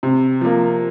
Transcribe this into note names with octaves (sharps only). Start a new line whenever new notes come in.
C3
F3 A#3